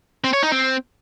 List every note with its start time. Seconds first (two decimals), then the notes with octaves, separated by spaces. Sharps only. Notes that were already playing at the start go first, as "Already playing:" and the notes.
0.24 C4
0.33 C#5
0.42 D#4
0.52 C4